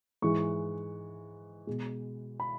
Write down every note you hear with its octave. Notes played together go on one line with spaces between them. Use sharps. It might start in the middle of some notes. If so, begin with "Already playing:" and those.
G#2 E3 G#3 C#6
B2 G#3
B5